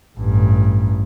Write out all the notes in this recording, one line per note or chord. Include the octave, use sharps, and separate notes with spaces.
A1 G2